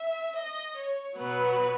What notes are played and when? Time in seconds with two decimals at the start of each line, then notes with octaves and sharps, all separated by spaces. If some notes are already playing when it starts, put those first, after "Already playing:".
Already playing: E5
0.35 D#5
0.75 C#5
1.16 B2 F#3 B3 B4